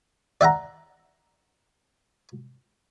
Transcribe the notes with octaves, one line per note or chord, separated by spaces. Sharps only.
D5 E5 F#5 A#5